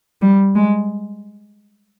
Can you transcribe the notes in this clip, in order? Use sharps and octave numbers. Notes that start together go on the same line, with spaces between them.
G3
G#3